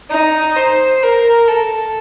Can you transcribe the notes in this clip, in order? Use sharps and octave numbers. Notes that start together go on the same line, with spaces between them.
D#4
C5
A#4
A4